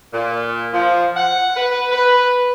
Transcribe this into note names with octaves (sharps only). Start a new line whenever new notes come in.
A#2
F3
F#5
B4
B4